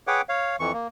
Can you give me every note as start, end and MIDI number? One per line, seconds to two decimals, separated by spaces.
0.07 0.21 68
0.07 0.21 71
0.07 0.21 73
0.07 0.21 78
0.07 0.21 79
0.07 0.21 86
0.29 0.56 73
0.29 0.56 77
0.60 0.72 41
0.60 0.72 52
0.60 0.72 85
0.74 0.88 58